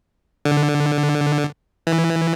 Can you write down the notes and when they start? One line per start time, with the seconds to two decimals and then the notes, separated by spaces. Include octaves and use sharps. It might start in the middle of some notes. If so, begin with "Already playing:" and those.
0.45 D3
1.87 E3